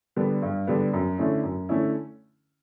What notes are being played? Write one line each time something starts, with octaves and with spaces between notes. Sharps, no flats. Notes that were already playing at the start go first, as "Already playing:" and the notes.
D3 G3 B3
G2
D3 G3 B3
F#2
D3 A3 C#4 E4
F#2
D3 A3 C#4 E4